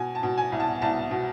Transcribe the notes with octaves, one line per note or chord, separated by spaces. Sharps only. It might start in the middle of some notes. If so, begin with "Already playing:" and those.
Already playing: B2 G#5
A5
B2
G#5
C2
A5
C2 A5
B2